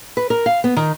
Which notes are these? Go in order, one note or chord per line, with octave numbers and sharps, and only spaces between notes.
B4
A#4
F5
B3
D#3